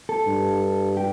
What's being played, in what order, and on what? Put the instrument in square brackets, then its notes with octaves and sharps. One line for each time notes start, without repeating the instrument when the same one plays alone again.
[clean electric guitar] A4
[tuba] G2
[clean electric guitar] G4